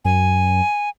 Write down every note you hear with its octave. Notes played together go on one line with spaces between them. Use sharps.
F#2 G#5